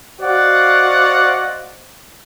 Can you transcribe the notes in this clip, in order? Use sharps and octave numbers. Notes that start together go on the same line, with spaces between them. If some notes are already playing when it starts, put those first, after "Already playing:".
F#4 C5 D5 D#5 F5 F#5